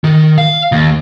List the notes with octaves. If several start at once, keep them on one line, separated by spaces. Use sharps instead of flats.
D#3
F5
D#2